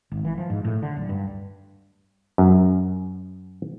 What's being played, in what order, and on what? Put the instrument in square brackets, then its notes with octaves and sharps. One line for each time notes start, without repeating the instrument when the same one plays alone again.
[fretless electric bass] G#1
E3
F3
G#2
A2
D3
D1
G2
[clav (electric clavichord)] F#2